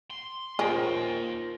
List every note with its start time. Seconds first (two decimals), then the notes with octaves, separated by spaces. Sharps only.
0.10 C6
0.59 D#2 C#4 F4 G#4 A#4 C5 G5